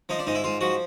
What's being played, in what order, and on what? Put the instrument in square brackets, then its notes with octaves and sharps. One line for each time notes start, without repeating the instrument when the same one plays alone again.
[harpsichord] F3 D#4
D4
G#2 D#4
E4
G#2 F4
F3 F#4